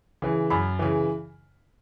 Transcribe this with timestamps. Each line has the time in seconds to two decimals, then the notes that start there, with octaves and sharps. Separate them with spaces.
0.22 C#3 E3
0.50 F#2 B5
0.79 C#3 E3